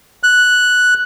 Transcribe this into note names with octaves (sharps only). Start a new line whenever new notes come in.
F#6